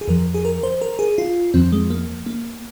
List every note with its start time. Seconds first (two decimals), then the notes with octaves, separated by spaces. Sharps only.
0.01 G#4
0.08 F2 F3 A#4
0.34 G#4
0.45 A#4
0.63 C5
0.82 A#4
0.99 G#4
1.18 F4
1.54 F2 F3 C4
1.72 G#3
1.90 A#3
2.26 A#3